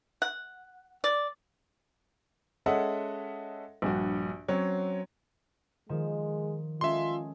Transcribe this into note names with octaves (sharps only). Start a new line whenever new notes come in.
F#5
D5
G#3 C#4 A4 D#5 E5 F#5
A#1 G2 F#4
F#3 C4 C#4 C#5
D#3 F3 G#3 E7
G#3 C#4 F4 A4 E5 C6